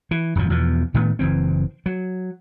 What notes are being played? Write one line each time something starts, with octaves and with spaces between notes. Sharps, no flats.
E3
D#1 F#2 A#2 F3
E2 B2 F3
A2 D#3 A3 B3
F#1 E3 C4
F#3